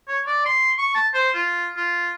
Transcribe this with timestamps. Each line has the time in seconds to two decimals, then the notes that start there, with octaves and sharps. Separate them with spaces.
0.08 C#5
0.27 D5
0.46 C6
0.78 C#6
0.95 A5
1.14 C5
1.35 F4
1.77 F4